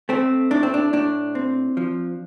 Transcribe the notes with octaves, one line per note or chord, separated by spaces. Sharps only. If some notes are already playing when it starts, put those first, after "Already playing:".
A3 C4
A2 D4
C4
D4
A2 D4
C4
F3